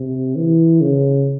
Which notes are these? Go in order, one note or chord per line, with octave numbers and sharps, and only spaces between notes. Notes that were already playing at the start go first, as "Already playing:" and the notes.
Already playing: C3
E3
C#3